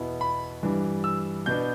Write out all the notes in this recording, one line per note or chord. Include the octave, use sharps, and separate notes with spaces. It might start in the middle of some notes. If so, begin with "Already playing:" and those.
Already playing: E2 B2 B3 E4
B5
G2 E3 G3 D4
E6
B2 B3 D4 G6